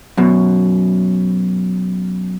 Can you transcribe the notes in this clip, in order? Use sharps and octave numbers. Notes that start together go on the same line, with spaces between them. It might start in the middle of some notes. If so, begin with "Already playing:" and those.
F#2 B2